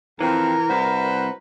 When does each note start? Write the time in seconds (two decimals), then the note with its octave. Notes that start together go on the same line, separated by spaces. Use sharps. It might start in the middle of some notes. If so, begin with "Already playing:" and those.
0.21 F2 E3 C4 A#4
0.70 C2 F#4 B4 C5